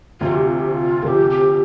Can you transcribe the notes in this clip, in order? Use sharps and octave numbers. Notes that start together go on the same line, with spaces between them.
D2 C3 F3 F4
G4
F4
G4
F4
D2 C3 F3 G4 A#4
G4